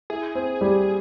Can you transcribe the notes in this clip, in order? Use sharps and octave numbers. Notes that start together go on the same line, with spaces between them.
E4 G#4
C4
G3